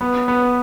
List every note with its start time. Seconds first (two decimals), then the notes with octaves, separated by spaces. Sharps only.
0.01 B3
0.28 B3